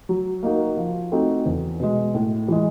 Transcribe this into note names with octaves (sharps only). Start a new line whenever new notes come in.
F#3
A#3 D#4 F#4 A#4
F3
A3 C4 D#4 F#4
E2
B2 G#3
A2
E3 G#3